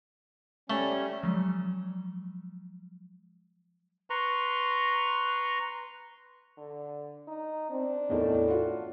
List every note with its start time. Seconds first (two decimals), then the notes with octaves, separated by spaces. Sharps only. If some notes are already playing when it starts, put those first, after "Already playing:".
0.70 G3 A3 C#4
1.23 F3 F#3 G#3
4.10 B4 A#5 C6 C#6
6.58 D3
7.28 D#4
7.71 C4 D4
8.10 E2 A2 D#4 A#4
8.48 F4 F#4